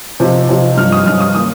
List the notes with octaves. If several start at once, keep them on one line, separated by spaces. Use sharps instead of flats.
C3 F3 D#4
C3 F3 D#4
G2 F3 D#4 F6
D#6
G2 F3 D#4 F6
D#6
D#3 A#3 D#6